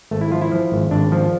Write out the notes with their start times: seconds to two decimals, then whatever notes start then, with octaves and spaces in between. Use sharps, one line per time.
0.11 G#1 A3
0.21 E4
0.32 F3 F4
0.41 E4
0.52 F3
0.72 G#1
0.91 G#1 D4
1.12 F3